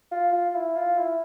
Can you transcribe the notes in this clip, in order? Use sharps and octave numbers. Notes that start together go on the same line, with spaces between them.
F4
F4
F4
E4
F4
E4